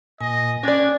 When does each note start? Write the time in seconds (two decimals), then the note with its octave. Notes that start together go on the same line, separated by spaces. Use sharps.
0.21 A#2 D#5 G#5
0.63 C#4 D4 G4 D5 G#6